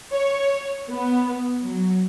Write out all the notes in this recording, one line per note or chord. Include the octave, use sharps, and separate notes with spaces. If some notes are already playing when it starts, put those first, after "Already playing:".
C#5
B3
F#3